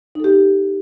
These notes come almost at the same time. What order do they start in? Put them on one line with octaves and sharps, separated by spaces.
D#4 A4 G4